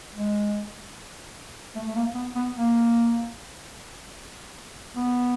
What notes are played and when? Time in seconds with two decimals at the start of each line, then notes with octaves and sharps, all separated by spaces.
0.14 G#3
1.76 A3
1.87 A3
1.96 A#3
2.15 B3
2.35 B3
2.55 A#3
4.96 B3